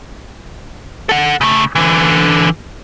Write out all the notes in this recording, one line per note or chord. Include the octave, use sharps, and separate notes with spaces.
A4 F#5
C#3 A3
D3 E3